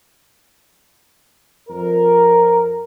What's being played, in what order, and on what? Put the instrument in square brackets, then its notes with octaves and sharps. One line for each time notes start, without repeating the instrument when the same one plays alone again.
[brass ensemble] F2 A#4